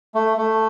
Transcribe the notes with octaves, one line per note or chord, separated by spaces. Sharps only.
A3
A3